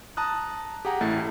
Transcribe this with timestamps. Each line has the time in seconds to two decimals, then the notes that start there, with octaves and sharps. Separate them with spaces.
0.17 A5 A#5 D#6 F#6
0.85 G4 G#4 F#5 A#5
1.01 A1 A3 E4 A6